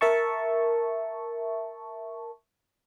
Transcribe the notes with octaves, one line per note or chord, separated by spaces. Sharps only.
A#4 E5 A5 C#6